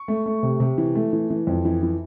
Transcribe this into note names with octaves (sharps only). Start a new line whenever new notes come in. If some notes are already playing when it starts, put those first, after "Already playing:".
Already playing: C#6
A3
A3
C3
C3
E3
A3
E3
E3
F2
E3
E3